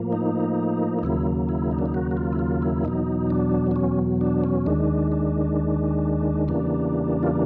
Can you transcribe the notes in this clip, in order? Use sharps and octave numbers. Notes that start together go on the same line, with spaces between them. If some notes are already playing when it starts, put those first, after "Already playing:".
Already playing: A2 F3 A#3
D#4
D#4
D#2 C#3 F#3 A#3 E4
E4
D#4
D4
D#4
F#4
F#4
F4
E4
F4
E4
E2 B2 F#3 D#4
D4
D4
C#4
D4
C#4
D#2 D#3 G#3 D4
D4
E2 C#3 E3 G3 A#3 D4
F4